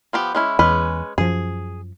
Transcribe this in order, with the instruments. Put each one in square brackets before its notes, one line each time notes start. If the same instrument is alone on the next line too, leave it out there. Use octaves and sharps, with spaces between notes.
[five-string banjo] F3 B3 G4
G#3 C#4 E4
[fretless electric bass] E2 [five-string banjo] G#3 C#4 B4
[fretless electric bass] F#2 F3 [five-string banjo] G#4